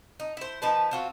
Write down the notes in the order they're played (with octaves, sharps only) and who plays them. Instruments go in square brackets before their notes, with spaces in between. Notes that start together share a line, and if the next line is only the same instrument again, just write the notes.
[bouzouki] D#4
E4 C5
F3 D#4 B4 A5
C4 F4 F#4